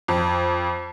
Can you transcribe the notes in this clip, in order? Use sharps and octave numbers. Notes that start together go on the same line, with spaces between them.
F2